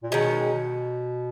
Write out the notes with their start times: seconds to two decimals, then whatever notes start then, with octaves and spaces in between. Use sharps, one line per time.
0.03 A#2
0.11 B2 D#3 G#3 C#4